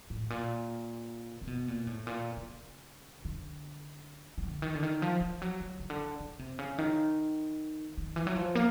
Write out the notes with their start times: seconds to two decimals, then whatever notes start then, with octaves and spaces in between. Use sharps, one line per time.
0.10 A2
0.30 A#2
1.42 C3
1.47 B2
1.68 A#2
1.87 A2
2.07 A#2
2.37 C#3
3.25 D3
4.38 D#3
4.43 D3
4.62 D#3
4.75 D3
4.83 D#3
5.02 F3
5.21 F3
5.42 F#3
5.60 F#3
5.80 C#3
5.90 D3
6.20 C#3
6.39 C3
6.59 C#3
6.78 D#3
7.98 D#3
8.16 E3
8.27 F#3
8.36 F3
8.55 A#3